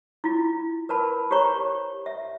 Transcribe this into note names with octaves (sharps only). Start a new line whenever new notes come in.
E4 F4
A#4 B4 A5 B5
G4 C5 C#5 A#5 C#6
E5